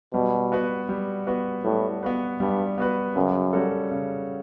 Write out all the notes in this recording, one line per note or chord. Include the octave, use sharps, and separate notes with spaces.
B2 G3
B3 F#4 B4
G3
B3 F#4 B4
A2 G3
B3 F#4 B4
G2 G3
B3 F#4 B4
F#2 C#3
G3 C#4 F#4 A4
C#3